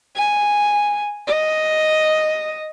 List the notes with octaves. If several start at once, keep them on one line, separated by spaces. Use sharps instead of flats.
G#5
D#5